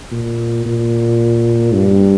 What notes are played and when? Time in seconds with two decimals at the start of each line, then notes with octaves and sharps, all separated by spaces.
0.11 A#2
0.65 A#2
1.74 G2